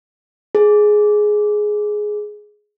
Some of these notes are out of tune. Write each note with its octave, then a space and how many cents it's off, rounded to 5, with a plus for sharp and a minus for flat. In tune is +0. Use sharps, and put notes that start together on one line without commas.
G#4 +10